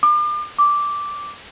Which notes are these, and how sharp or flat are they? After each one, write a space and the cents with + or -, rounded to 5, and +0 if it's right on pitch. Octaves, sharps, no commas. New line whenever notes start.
D6 +40
D6 -5